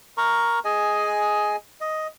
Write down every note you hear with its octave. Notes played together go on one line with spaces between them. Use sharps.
A#4 A#5 C#6
G#4 D#5 G#5
D#5